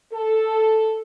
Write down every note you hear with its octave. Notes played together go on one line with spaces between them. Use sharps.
A4